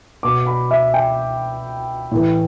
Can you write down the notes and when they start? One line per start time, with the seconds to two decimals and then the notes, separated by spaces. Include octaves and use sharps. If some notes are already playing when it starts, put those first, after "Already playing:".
0.23 B2 D6
0.47 B5
0.71 E5
0.94 G5
2.11 A2 E3